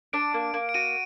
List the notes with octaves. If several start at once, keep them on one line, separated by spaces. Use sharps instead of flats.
D4 D7
A#3
A#3
D7
F#4 D#7